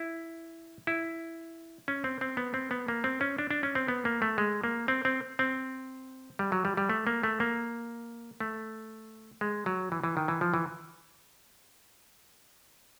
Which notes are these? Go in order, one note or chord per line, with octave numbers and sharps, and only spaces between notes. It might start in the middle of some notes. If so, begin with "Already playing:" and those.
Already playing: E4
E4
C#4
C4
C4
B3
C4
B3
A#3
C4
C#4
D4
D4
C#4
C4
B3
A#3
A3
G#3
A#3
C4
C4
C4
G3
F#3
G3
G3
A3
A#3
A3
A#3
A3
G#3
F#3
E3
E3
D#3
E3
F3
E3